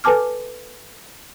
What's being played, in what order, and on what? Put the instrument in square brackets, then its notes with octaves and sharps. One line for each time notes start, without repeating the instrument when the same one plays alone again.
[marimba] A4 B4 G#5 A5 D6 F6